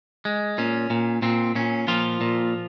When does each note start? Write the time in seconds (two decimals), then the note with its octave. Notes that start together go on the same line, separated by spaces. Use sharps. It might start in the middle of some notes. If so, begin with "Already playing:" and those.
0.25 G#3
0.58 A#2 C#4
0.90 A#2
1.22 A#2 C4
1.55 A#2 C#4
1.88 A#2 F3 F4
2.21 A#2